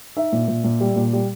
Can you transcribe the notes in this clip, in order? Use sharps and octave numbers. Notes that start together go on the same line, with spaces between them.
D#4 E5
A#2
A#2
A#2
G3
A#2
G3